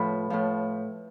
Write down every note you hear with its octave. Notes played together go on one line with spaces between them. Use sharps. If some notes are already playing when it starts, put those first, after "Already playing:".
Already playing: A2 F3 B4
A2 F3